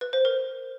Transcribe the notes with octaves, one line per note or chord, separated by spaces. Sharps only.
B4
C5
A#4